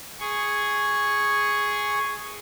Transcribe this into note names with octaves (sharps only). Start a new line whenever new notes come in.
G#4 C#6